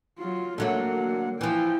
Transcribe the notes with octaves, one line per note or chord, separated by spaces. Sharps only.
F#3 F4
D3 F#3 A3 A#3 F#5
E3 F3 E4 G5